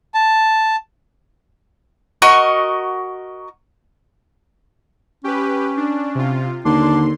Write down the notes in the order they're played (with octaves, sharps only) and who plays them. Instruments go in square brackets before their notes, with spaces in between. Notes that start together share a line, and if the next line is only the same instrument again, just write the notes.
[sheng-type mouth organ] A5
[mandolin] F#4 A#4 D#5 C#6
[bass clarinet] C#4 [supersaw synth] G4 B4
[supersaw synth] D4
C3 F4
[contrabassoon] D#2 [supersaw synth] D3 C6 [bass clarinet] D4